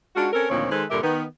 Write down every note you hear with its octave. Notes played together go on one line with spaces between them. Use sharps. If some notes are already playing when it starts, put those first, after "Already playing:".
G#3 D4 D#4 F4 F#4
C4 C#4 A4 A#4
D2 A#2 D#3 F3 C4 C#5
D#3 G#3 A4 B4 C5
G2 A#2 D3 G4 A#4 E5
D#3 B3